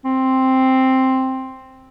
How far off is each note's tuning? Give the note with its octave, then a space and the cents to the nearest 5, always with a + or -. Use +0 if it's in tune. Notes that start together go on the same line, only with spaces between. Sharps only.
C4 +5